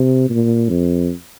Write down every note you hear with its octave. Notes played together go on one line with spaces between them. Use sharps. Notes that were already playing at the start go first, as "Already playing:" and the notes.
Already playing: C3
A#2
F2